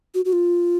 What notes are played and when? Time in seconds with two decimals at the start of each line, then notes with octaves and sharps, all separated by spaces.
0.14 F#4
0.25 F#4
0.33 F4